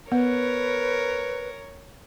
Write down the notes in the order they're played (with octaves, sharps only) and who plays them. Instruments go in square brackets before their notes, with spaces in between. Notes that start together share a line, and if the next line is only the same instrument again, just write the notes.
[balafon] B3 [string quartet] A#4 C#5 [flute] B4